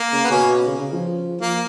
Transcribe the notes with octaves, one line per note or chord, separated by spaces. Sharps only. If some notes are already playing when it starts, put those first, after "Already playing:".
Already playing: A#3
C#3
B3
B2 C#4
C#3
C#3
F3
F3 A#3